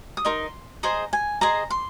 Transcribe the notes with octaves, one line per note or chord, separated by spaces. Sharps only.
D#6
D#4 A#4 D#5 C6
G#4 C5 D#5 A#5
G#5
G#4 C5 D#5 A#5
C6